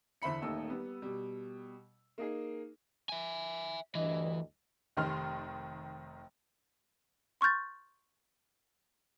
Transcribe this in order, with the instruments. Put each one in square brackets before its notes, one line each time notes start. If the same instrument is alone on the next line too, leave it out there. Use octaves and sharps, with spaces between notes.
[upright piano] E2 D3 C5 E5 B5 C#7
D#1 D#2 A3 D#4 E6
G3 B3
B2 G3
A#3 D#4 G#4
[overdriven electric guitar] E5 G#5
[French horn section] D2 G2 D#5 [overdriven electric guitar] E3
[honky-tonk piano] F1 D#3 C6 F6
[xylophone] C6 C#6 F6 G6 A6